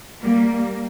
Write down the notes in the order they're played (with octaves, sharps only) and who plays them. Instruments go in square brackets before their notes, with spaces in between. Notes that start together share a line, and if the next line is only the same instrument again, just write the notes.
[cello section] G3 A#3